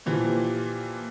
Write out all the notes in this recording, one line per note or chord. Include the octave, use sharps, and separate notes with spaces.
A#2 E3 F3 G4